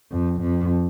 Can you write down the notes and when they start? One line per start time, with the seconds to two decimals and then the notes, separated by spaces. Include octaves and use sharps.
0.11 F2
0.41 F2